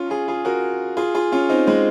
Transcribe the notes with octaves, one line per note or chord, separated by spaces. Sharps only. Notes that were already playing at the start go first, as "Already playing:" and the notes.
Already playing: C#4 F4
F4 G#4
F4 G#4
F#4 A#4
F4 G#4
F4 G#4
C#4 F4
C4 D#4
G#3 C4